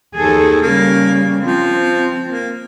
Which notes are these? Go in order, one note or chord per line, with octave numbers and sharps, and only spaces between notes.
D#2 G#4 A4
C#3 G3 A#3
F3 C4
A#3